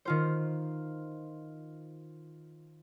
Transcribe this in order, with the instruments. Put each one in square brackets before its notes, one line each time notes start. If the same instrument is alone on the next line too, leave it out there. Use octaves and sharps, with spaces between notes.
[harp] D#3 F4 C5